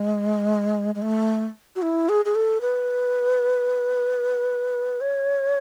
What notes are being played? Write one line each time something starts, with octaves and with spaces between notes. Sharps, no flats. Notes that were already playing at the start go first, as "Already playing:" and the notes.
Already playing: G#3
G#3
A3
F#4
E4
G#4
G#4
A4
B4
C#5